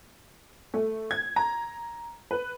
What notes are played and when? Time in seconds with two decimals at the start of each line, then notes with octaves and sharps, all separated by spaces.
0.74 A3
1.11 G#6
1.36 A#5
2.31 B4